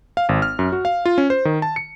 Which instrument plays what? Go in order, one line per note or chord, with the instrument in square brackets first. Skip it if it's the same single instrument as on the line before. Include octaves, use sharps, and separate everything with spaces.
[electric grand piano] F5
G#1
F6
F#2
F#4
F5
F4
C#4
C5
D#3
A5
C#7